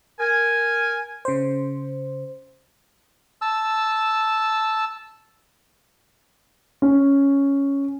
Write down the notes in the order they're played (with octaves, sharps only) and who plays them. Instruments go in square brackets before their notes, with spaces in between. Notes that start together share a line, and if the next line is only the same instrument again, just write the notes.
[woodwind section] A#4 G#5
[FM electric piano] C#3 C5
[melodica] A5 E6
[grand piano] C#4